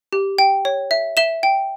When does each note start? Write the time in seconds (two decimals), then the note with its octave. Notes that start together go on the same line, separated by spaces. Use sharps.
0.13 G4
0.38 G5
0.65 C#5
0.91 E5
1.17 E5 E7 G7
1.43 G5